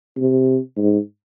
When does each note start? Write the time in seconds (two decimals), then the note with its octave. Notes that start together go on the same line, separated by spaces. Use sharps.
0.17 C3
0.77 G#2